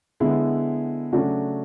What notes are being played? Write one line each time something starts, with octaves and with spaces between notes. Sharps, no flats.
D3 G#3 B3 E4
C#3 F#3 A3 D4 F#4